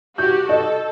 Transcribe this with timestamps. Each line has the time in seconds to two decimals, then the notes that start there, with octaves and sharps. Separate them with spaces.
0.18 F#4 G4 G6
0.49 A4 D#5